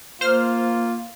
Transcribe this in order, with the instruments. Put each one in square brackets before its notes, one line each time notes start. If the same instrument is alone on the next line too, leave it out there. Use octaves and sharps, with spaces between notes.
[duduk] A#3 [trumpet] F4 [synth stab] C5 F6